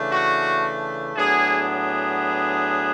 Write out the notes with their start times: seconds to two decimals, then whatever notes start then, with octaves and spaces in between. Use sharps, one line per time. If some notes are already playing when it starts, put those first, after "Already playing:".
Already playing: C#3 E3 A3 D4
0.10 F#4
1.16 A2 F#3 B3 D4 G#4
1.68 G#4